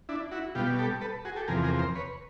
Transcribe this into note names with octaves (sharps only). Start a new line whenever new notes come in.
D4 E4
E4 F#4
B2 G3 F4 G4
G4 A4
A4 B4
F#4 G#4
G4 A4
E2 C3 F3 G#4 A#4
G#4 A#4
A#4 C5
B4 C#5